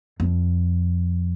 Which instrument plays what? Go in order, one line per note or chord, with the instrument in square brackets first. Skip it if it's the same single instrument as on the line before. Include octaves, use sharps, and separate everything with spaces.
[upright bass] F2